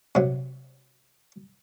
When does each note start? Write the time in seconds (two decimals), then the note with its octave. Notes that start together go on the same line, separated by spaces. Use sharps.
0.15 C3 F#3